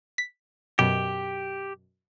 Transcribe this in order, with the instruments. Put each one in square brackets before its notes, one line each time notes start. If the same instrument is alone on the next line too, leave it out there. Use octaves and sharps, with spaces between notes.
[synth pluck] B6
[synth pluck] F#2 B2 [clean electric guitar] G4